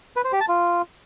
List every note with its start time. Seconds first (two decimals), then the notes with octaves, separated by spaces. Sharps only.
0.16 B4
0.24 C5
0.32 G4
0.40 A5
0.48 F4